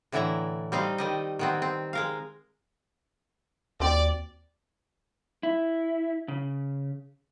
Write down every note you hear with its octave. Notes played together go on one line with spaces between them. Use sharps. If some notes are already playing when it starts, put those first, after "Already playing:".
A2 D3 E3 D5 E5 A#5
G3 C4 D#4 F5
D#3 G3 D#5
D#3 B3 C4
C4
G#3 A#4 F5
D#2 C4 F#4 G4 D5
E4
C#3